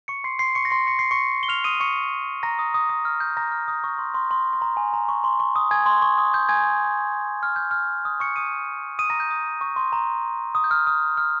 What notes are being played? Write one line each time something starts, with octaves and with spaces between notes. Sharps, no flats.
C#6 C#7
C6 C7
C6 C7
C#6 C#7
A#6
C6 C7
C#7
C7
C#6 C#7
G7
F6 F7
D#6 D#7
C#6 C#7
A#5 A#6
D#6
D#6
D#6
F6
G6
A#5 A#6
F6
D#6
C#6
C6
C6
C6
C6
A#5
G#5
A#5
C#6
C6
C#6
D#6
G#5 G#6
C6
C#6
D#6
G6
G#5 G#6
F6
G6
F6
D#6
C#6 C#7
D#6 D#7
D#6 D#7
A#5 A#6
G6
D#6
C#6
C6
A#5
D#6
G6
F6
D#6
F6